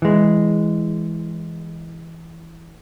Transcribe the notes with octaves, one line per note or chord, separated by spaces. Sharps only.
E3 G#3